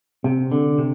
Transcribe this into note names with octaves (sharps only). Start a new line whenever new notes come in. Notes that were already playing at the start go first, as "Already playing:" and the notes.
C3
D3
C3